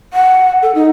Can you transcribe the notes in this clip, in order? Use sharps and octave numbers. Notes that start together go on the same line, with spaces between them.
F#5
A4
D#4